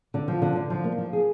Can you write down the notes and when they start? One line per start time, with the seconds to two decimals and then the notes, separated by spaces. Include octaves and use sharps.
0.14 D3
0.28 F3
0.42 D3
0.56 D3
0.70 F3
0.84 A#3
0.98 F3
1.13 G#4